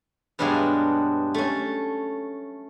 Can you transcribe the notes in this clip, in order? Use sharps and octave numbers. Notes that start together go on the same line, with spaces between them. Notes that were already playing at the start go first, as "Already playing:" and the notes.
G2 B2 F#3 G#3 D4 F5
A3 C#4